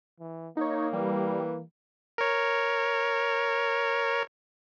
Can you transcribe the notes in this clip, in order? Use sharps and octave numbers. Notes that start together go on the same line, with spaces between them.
E3
A#3 D#4 C#5
E3 G3
A#4 C#5